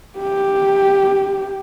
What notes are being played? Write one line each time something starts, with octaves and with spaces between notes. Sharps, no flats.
G4